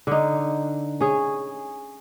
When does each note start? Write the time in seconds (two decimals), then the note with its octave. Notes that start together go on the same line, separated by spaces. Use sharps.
0.07 D3 D#4
1.01 C#4 G#4